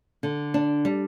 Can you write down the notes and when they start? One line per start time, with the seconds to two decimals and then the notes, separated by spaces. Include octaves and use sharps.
0.23 D3
0.54 D4
0.85 G3